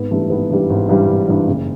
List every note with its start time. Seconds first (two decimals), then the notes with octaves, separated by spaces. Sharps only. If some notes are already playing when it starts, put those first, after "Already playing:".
Already playing: G#1 B3
0.11 G2 E3 G3 A3
0.30 G#1 B3
0.50 G2 E3 G3
0.70 G#1
0.89 G2 E3 G3
1.08 G#1
1.28 G2 E3 G3
1.48 F#1